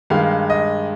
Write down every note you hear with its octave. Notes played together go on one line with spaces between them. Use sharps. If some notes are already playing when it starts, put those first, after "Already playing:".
G2 D#3 G#3 F5
D#5